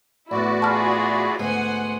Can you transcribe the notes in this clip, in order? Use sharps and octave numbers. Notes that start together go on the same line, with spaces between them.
A1 E2 E4 F#4 D5
E4 F4 G#4 A5 F6
D2 G#2 B3 C5 F#5 G#5